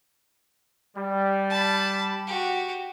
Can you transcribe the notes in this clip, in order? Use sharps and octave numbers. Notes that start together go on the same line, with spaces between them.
G3
A5 B5
F#4 G4